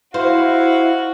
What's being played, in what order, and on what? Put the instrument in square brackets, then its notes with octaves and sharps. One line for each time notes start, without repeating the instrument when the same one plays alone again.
[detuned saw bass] E4 [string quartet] F#4 [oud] C5 [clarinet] F5